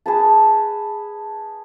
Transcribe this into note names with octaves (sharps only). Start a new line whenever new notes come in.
G#4 B4 A5